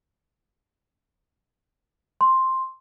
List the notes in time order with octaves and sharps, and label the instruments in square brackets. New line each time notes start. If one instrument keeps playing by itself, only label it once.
[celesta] C6